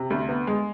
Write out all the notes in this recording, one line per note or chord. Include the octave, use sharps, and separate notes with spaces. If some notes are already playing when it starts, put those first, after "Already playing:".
Already playing: C3
D2
B3
G#3